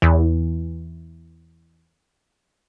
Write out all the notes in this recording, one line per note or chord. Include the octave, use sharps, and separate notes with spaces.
E2 E3